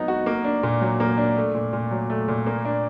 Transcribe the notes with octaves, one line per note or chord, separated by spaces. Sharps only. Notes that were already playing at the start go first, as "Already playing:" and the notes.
Already playing: F#3 B3 D#4
F#4
A#3
D4
A#2
F#3
A#3
D4
A3
A#2
A#2
F#3
A3
A#2
A#3
D4